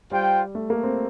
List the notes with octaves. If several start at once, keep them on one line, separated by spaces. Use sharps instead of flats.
G3 F4 C5 G5
A3
A#3
C4